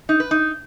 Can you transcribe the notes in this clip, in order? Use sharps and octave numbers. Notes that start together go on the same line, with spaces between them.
D#4
B4
D#4